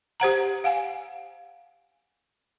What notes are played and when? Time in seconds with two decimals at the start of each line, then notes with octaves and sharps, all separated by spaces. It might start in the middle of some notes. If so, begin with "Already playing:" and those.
0.20 G4 C5 F#5 A#5
0.64 F5 F#5 G#5